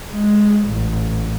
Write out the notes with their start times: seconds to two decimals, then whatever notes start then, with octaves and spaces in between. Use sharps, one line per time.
0.12 G#3
0.69 A1